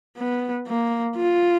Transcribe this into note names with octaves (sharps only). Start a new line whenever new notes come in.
B3
A#3
F4